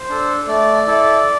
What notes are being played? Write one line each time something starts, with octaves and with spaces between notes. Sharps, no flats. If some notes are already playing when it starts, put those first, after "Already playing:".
Already playing: C5
D4 A4
A3 D5
E4 A4